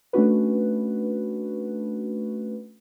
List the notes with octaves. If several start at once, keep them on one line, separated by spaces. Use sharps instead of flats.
A3 C#4 D4 F#4 B4